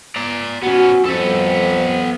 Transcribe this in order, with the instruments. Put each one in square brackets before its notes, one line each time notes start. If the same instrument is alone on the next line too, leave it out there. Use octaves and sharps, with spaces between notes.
[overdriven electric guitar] D5 A#5
[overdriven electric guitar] B3 C#4 [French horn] F#4
[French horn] F2 [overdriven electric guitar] B3 A4